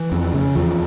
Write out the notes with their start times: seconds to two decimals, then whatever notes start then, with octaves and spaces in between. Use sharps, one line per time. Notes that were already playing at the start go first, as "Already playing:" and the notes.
Already playing: E3
0.12 F2
0.33 C#3
0.55 E2 F3